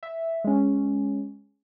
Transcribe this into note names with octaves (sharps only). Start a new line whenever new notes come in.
E5
G#3 C#4